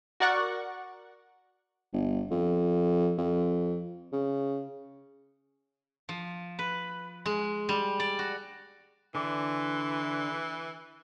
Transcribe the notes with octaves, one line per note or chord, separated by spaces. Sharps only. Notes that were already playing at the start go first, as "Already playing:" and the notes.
F#4 A#4 D5 F#5 C#6
G1
F2
F2
C#3
F3
B4
G#3
G3
D5
F#4
D3 E3 D6